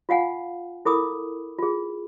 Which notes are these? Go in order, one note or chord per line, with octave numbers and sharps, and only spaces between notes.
F4 F5 F#5 G#5
E4 A4 A#4 B5 D6 D#6
F4 G#4